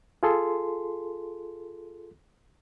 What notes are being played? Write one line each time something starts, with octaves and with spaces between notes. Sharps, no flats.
F4 G#4 A4 C6